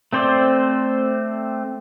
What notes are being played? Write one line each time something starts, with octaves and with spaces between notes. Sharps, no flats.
A3 C4 C5 D5